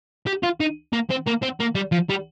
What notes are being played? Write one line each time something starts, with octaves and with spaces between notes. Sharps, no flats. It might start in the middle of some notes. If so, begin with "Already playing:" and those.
G4
F4
D#4
A#3
C4
A#3
C4
A#3
G3
F3
G3